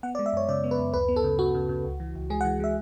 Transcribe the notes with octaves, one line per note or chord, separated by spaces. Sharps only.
B3 F#5
D5
G#3
E5
F#2 C#5
C#3 D5
B3
B4
F#2
D2 B4
B3
A4
C#3
C#3 F#4
C#3
C#3
C#2
E3
C#2
G#3 G#4
F#5
E3
G#3 E5